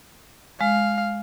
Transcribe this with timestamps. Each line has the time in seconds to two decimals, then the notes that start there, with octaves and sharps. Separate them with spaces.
0.61 G#3 F5